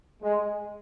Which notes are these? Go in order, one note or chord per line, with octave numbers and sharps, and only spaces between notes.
G#3